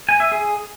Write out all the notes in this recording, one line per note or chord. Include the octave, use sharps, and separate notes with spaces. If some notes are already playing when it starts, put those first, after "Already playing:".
G#5
E5
G#4